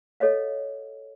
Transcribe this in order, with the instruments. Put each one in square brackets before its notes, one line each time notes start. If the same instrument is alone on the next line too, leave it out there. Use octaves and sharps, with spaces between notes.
[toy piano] A4 C#5 D#5 F5